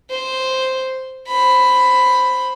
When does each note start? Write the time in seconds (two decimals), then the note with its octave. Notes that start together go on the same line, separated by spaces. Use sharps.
0.10 C5
1.28 C5 B5